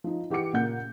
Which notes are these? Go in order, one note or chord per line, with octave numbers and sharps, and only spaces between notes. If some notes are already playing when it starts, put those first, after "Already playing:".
F3 D#4
E3 G4 F#5 D6 C#7
A#2 C#3 A#3 F#5 G6